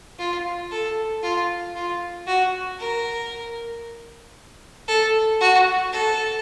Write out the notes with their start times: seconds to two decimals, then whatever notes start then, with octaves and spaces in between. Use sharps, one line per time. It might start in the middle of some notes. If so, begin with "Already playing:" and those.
0.19 F4
0.71 A4
1.23 F4
1.75 F4
2.27 F#4
2.79 A#4
4.88 A4
5.41 F#4
5.93 A4